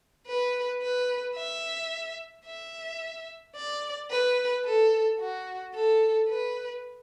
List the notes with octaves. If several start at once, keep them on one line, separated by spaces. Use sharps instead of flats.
B4
B4
E5
E5
D5
B4
A4
F#4
A4
B4